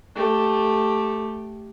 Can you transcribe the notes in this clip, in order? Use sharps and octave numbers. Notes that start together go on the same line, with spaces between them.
A3 G4